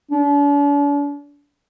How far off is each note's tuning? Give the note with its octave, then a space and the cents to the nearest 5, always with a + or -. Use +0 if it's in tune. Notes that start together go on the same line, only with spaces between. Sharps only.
D4 -45